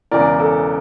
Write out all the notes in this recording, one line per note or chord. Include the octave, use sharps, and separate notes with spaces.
E1 E2 C#3 E3 A#4 D5
A4